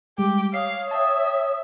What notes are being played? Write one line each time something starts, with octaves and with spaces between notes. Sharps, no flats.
G3 G#3 G4
C#5 F5 D#6 C7
E5 G5 A5